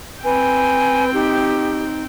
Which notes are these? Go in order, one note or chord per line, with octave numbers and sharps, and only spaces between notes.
C4 B4 G5 G#5
D#4 G4